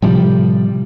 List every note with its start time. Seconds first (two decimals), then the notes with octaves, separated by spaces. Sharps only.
0.02 A2 C3 F3 G3